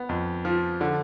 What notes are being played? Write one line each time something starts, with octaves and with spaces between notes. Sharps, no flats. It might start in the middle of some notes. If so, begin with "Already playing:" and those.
Already playing: B3
F2
F3
D3